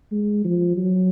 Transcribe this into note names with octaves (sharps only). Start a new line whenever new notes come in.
G#3
F3
F#3